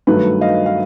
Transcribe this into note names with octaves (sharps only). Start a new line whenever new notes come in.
G2 D#3 F#3 A3 B4
D#5 F5
F5